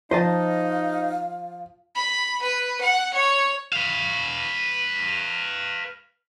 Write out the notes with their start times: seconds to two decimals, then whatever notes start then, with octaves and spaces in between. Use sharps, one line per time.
0.11 F3 D#4 C5 D#5 F5 A5
1.95 B5
2.42 B4
2.80 F#5
3.14 C#5
3.72 B4 F5